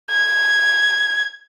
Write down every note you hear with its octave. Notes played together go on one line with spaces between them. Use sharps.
G#6